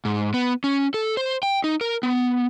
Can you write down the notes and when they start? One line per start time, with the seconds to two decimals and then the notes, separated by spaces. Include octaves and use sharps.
0.05 G#2
0.34 B3
0.64 C#4
0.94 A4
1.17 C5
1.43 G5
1.64 D#4
1.81 A#4
2.03 B3